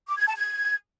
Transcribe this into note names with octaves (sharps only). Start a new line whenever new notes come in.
D6
G#6
A5
G#6